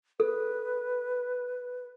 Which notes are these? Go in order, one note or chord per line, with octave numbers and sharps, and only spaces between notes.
A4 B4